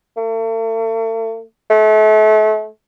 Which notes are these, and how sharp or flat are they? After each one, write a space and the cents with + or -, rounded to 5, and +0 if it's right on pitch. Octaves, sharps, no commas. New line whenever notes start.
A3 +45
A3 -35